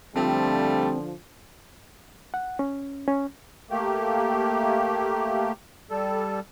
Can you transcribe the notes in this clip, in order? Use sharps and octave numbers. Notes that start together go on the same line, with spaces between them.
D3 F3 G3 A3 C4
F#5
C#4
C#4
A3 A#3 G4
G3 A4